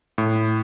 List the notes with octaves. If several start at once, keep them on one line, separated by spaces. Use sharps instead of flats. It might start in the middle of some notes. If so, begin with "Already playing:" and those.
A2